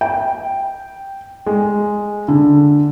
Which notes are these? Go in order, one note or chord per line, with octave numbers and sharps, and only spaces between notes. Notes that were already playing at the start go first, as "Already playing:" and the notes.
G5
G#3
D3